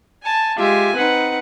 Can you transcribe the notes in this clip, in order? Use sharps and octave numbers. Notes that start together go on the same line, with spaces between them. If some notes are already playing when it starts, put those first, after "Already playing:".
G#5 A5
G#3 F4 G4 E5 G#5
C4 D#4 B4 F#5